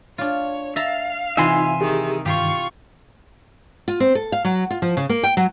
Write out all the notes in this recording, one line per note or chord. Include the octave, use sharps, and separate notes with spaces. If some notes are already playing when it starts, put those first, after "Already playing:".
D4 F4 C#5
E5 F5 A5 A#5
C3 E3 D#4 F4 E5 G#5 C6
D#3 G4 G#4
G2 D#3 F4 G4 C#6
F4
C4
A4
F5
F#3
F4
F3
C#3
A#3
G5
F#3